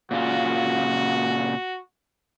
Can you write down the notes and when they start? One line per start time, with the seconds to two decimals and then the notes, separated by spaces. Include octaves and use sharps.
0.11 A#2 C#3 F4 F#4